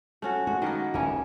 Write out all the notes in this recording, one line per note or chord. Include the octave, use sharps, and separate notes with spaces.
A3 C#4 F#4
G#3 F#4
D#3 A#3 B3
D1 D2 D#3 E3 C#4